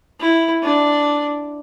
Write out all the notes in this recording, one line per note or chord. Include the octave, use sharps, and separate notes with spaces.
E4
D4